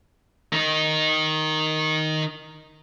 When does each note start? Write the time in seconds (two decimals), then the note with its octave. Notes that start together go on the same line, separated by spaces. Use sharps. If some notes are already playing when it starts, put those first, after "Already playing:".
0.53 D#3 D#4